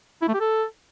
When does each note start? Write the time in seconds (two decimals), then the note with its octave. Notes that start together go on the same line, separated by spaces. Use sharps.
0.22 E4
0.28 A3
0.34 G4
0.40 A4